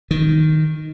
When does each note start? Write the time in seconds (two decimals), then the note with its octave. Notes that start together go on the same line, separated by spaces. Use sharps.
0.11 D#3